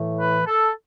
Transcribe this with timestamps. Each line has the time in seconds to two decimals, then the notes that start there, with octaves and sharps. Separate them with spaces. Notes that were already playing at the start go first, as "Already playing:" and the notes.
Already playing: A2 E3 A3
0.20 B4
0.47 A4